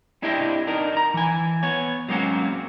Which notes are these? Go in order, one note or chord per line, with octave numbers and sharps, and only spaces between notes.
C4 D4 E4 G4 C5 D#5
D4 D#4 A#4
D4 A#5
E3 G#5
B3 C#5
F#3 G#3 A#3 C4 C#4 F#4